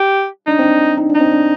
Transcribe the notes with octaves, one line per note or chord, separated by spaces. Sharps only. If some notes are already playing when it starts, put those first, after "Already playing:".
Already playing: G4
D4 D#4
C4
D4
D#4
D4
D#4
C4
D4